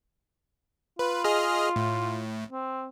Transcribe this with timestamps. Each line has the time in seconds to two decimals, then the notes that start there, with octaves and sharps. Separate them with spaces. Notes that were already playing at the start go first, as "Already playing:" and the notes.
0.99 F4 B4
1.24 G#4 D#5 F6
1.76 A2
2.51 C4